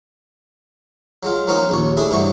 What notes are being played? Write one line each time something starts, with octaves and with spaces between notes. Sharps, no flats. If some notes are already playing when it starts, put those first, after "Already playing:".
F#3 G#3 F4
F3 F#3 A#3 C#4 D#4 F4
A#1 D#2 C#5
A3 D4 E4 G#4
G2 C3 E3 F#3 C#6